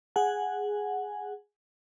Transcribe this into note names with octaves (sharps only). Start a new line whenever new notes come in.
G#4 F#5 G#5